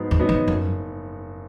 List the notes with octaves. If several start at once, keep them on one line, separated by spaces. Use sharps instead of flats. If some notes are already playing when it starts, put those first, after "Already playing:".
Already playing: G#2 F#3 B3 D#4
E2
F#3 B3 D#4
E2
F#1 F#2